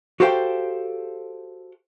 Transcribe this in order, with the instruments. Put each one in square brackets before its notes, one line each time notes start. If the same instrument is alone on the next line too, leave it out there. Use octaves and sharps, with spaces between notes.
[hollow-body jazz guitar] F#4 G4 A4 C5 F5 G5